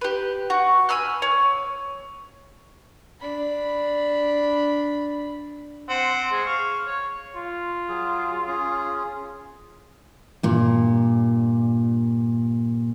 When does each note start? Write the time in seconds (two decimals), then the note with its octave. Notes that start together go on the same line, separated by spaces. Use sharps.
0.01 G4 B4
0.50 F#4
0.89 G#5 B5 E6 F6
1.22 C#5
3.21 D4 B5
5.89 C4 F#5 C6
6.32 G#3
6.45 F5 C#6
6.86 C#5
7.37 F4
7.88 F#3 G#4
8.47 C#4 G#4
10.43 G2 A#2